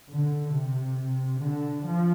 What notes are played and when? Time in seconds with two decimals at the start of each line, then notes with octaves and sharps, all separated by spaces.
0.08 D3
0.52 C3
1.39 D3
1.84 F3